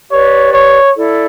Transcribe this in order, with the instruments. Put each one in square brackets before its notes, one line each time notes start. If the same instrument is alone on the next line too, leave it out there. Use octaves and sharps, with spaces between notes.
[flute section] G4 B4 D5 [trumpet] C#5
[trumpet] C#5
[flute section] E4 A4 D5